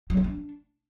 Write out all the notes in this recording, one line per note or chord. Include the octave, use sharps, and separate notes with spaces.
F#3
C4
D4